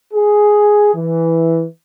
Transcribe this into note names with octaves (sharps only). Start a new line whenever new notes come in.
G#4
E3